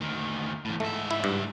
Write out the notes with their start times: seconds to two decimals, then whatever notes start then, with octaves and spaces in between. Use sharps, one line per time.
0.01 D2 D#3
0.65 E2 A2
0.80 G#2 A3 E5
1.11 E4
1.24 G2